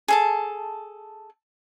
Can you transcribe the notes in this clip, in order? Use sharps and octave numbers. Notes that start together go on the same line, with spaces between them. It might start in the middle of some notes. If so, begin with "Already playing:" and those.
G#4 A4 A5